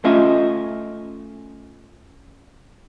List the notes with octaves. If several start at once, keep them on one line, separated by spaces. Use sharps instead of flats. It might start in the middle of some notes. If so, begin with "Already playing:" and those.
A3 C#4 F4 D#5 E5